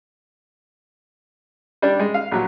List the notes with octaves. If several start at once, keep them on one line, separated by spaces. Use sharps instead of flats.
G3 D4
G#3
F5
A#1 F#3